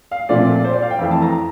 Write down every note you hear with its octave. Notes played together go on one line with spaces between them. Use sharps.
F5
A#2 F3 A3 C4 D5
C5
D5
F5
G5
F2 E3 A3 C4
A5
A#5